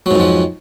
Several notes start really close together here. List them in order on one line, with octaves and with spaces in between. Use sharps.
F#3 G#2 F2 F3